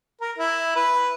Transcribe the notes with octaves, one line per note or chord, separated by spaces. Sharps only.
A#4
E4
B4